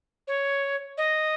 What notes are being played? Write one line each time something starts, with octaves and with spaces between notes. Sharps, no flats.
C#5
D#5